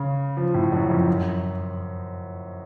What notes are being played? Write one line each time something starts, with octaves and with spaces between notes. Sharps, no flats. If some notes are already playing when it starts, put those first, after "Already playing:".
Already playing: C#3
F3
A2
F#2
F2
F#2